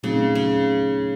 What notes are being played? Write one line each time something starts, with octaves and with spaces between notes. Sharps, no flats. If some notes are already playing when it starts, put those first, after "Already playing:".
A#2 C#3 F#3 A3 C4 D#4
C#3